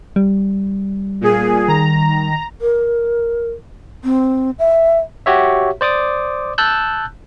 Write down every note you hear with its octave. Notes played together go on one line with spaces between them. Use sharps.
G3
A#2 G#4
D#3 A#5
A#4
C4
E5
F#4 G4 C#5 E5
C5 D5 D6 D#6
A5 E6 F#6 G6